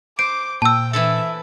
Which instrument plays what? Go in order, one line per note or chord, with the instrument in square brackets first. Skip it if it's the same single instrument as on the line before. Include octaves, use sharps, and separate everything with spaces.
[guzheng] C5 [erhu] D6 [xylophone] D7
[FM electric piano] A#2 [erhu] G5 [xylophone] A5 E6
[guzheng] E3 E4 A4 [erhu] E5